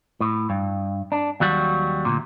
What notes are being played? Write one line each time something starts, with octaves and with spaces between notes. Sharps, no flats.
A2
G2
D4
D#2 F#3 G3 F#4
D2 G2 A#2